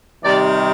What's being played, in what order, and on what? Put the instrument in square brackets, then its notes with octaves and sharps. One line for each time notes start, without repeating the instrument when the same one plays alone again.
[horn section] C3 D#3 G3 D5